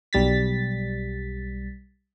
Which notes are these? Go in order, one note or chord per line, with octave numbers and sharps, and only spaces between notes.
B1 G3 A6 B6